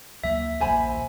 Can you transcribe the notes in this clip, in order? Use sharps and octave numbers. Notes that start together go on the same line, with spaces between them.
D2 F#3 A#3 E5
D#1 A#1 A#2 C5 G#5 B5